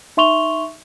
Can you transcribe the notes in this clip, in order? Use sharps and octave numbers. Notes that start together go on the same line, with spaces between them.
D#4 E5 C6 C#6 F7 G7